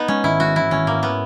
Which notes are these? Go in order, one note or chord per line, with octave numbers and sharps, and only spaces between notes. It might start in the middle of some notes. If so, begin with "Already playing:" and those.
Already playing: B3 D#4
G#3 C#4
G#1 E4
G#2 F#4
E3 E4
G#1 C#4
G#2 A#3
B3